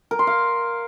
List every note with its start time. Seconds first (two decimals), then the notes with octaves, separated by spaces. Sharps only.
0.11 A#4
0.19 C6
0.27 F5